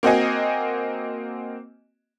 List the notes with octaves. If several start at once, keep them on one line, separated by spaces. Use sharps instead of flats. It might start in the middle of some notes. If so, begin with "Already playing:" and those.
A#3 C4 F#4 D#5 G#5